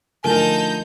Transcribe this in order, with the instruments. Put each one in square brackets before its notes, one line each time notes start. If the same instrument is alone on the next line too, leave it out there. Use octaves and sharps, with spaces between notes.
[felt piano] D3 F3 A3 [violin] D#4 G6 [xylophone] A#4 G#5 [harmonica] A5